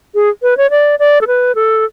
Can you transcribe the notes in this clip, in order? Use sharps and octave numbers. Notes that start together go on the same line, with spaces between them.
G#4
B4
C#5
D5
D5
A4
B4
A4